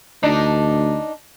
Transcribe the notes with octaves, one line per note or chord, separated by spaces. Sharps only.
D2 D4 D#4